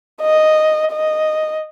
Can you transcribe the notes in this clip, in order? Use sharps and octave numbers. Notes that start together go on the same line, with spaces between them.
D#5
D#5